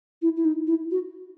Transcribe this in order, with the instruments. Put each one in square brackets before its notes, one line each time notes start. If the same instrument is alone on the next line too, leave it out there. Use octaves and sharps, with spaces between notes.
[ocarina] E4
E4
D#4
E4
F#4